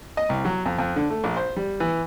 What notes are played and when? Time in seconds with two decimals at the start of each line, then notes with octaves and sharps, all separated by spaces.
0.17 D#5
0.29 C2
0.45 F#3
0.66 F2
0.78 F2
0.96 D3
1.10 A3
1.24 A#1
1.37 C5
1.56 G3
1.80 E3